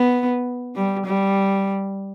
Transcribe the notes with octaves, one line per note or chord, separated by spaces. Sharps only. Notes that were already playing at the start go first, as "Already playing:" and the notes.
Already playing: B3
G3
G3